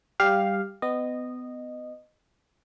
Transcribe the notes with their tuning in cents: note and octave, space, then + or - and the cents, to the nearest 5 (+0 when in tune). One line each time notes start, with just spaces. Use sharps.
G3 +0 G4 +5 F5 +0
B3 +30 D#5 -15